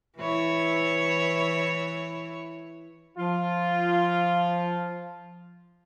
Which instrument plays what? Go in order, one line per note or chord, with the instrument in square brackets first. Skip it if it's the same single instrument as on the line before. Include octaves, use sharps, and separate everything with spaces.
[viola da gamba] E3 E4 C#5
[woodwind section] F3 [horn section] F4